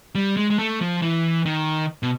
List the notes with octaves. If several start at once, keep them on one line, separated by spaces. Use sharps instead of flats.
G3
G#3
G#3
A3
F3
E3
D#3
B2